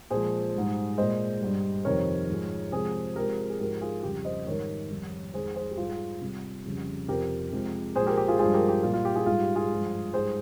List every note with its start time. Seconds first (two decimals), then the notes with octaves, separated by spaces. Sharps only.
0.10 A#2 F3 G#3 G#4 C5
0.54 G#2 G3
0.98 A#2 G#3 C5 D#5
1.41 G2 G3
1.85 F2 C3 D#3 G3 A#4 C#5
2.29 G#2 F3 G#3
2.72 C3 F3 G#3 G#4 C5
3.16 C3 F3 G#3 G4 A#4
3.50 G#4
3.59 G#2 F3 G#3 G4 A#4
3.81 F4 G#4
4.03 F2 C#3 G3 G4
4.25 C5 D#5
4.47 G#2 D#3 G3 A#4 C#5
4.91 F2 D#3 G3
5.34 F2 D#3 G#3 G#4 C5
5.56 G#4 C5
5.71 G4
5.77 G#2 G3 F4 G#4
6.21 C3 G3
6.65 F2 C#3 G3
7.08 F2 C3 F3 G4 A#4
7.52 C3 F3 G#3
7.95 A#2 F3 G#3 G#4 C5
8.06 G4 A#4
8.17 G4
8.28 F4 G#4
8.39 G2 F3 G#3 F4 G#4
8.54 G4 A#4
8.68 G4
8.83 A#2 G3 F4
8.93 F4
9.05 G4
9.15 F4 G#4
9.26 G#2 G3 F4
9.41 G4
9.55 F4 G#4
9.70 G2 F3 G#3
10.13 G#2 G3 G#4 C5